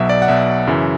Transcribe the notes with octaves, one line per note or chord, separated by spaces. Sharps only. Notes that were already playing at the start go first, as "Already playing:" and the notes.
Already playing: B1 B2 F#3 E5
D5
F#5
B1 B2 F#3 E5
F#2 C#3 E3